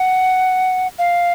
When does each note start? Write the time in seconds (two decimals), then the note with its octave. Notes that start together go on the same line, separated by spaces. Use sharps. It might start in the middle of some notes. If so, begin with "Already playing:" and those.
Already playing: F#5
0.99 F5